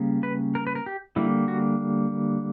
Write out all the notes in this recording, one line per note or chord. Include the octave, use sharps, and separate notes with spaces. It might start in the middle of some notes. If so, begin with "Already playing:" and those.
Already playing: C#3 G3 A#3
B4
A#4
B4
A#4
G4
D3 G3 A#3 E4
F#4